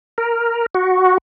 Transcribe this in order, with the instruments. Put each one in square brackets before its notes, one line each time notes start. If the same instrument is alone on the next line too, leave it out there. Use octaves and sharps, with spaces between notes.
[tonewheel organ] A#4
F#4